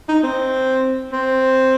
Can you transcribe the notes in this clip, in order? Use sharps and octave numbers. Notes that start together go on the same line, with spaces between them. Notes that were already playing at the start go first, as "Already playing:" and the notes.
D#4
C4
C4